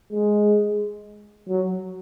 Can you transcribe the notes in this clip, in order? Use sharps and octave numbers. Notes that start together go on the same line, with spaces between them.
G#3
F#3